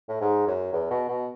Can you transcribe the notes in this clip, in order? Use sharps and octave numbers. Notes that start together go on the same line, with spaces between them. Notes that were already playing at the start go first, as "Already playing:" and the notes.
A2
G#2
F#2
E2
B2
B2